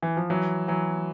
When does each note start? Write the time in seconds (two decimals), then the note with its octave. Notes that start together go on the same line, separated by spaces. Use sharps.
0.03 E3
0.17 F3
0.30 E3 F#3
0.68 E3 F#3